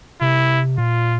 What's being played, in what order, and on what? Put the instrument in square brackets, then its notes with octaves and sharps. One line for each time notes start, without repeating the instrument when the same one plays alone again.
[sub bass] C3 [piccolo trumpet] E4
[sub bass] A#2 [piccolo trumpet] F4